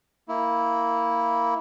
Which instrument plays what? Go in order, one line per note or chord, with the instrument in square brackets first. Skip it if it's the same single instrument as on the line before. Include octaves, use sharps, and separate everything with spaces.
[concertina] A#3 E4